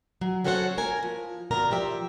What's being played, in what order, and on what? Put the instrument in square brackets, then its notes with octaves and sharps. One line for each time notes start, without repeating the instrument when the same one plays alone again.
[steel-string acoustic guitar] F#3
C#4 F#4 A4 C5 C#5 F#5
A#4 G#5
F3
B2 D#3 A#4 D5 A#5
F3 G4 C5 D5 E5